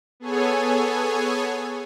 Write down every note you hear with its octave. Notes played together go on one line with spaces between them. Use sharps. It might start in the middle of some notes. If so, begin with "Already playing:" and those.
B3 G#4 A4 C#5 G#5